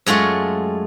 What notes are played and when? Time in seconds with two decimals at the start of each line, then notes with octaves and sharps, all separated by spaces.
0.06 F#2 G#3 A3 F4 C#5